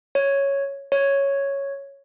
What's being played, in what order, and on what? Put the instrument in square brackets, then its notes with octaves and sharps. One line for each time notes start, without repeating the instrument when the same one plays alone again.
[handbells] C#5
C#5